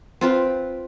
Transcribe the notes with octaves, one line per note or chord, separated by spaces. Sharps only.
C4 F4 B4